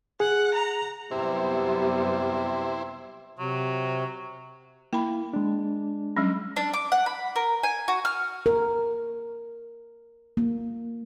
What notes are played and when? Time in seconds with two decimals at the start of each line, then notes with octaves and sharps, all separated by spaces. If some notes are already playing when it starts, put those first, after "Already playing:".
0.20 G#4 F#5
0.54 A#5
1.11 F#2 C3 G3 B3 E4 C5
3.39 C3 F#3
4.93 A#3 E4 G5 B5
5.33 G#3 D4
6.17 F#3 G3 C#4
6.56 D4
6.74 D6
6.92 F#5
7.06 B5
7.36 A#4
7.63 G#5
7.88 F#4
8.05 F6
8.46 A#4
10.37 A#3